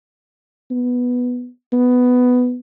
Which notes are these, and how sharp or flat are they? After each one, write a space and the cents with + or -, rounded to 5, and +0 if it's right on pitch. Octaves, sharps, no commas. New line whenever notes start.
B3 +0
B3 +10